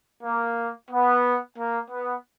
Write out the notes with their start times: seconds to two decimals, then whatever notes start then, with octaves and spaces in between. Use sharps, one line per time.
0.23 A#3
0.91 B3
1.57 A#3
1.91 B3